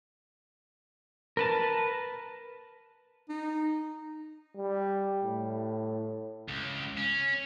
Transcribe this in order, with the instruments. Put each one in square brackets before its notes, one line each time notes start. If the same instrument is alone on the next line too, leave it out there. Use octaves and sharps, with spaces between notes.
[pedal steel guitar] A#4 B4 A5
[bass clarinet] D#4
[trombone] G3
A2
[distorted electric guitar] C#2
C#4